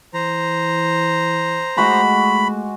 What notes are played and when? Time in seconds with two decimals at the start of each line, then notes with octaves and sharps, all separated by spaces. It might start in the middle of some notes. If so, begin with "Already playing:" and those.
0.14 E3 C5 A#5
1.77 G#3 A3 F#4 B5 D6